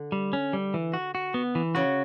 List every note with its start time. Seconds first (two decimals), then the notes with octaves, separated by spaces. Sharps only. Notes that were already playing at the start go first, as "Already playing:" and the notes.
Already playing: D3
0.12 G3
0.33 C#4
0.53 G3
0.74 E3
0.94 F#4
1.15 F#4
1.34 B3
1.55 E3
1.75 C#3 F#4